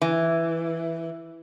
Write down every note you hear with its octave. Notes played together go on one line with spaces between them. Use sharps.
E3